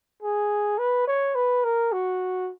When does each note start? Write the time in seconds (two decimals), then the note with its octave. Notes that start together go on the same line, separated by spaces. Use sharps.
0.23 G#4
0.79 B4
1.07 C#5
1.35 B4
1.64 A#4
1.92 F#4